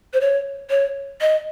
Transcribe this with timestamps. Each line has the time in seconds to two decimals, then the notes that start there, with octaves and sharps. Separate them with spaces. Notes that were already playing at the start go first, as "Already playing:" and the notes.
0.13 C5
0.21 C#5
0.70 C#5
1.21 D#5